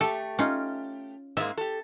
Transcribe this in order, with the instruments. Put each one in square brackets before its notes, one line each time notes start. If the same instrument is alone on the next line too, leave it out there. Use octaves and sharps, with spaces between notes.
[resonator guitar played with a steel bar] A3 G4 [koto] A4
[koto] C#4 D#4 F4
[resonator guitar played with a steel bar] G#2 G#3 A#3 [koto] E5
[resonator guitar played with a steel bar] G4 A4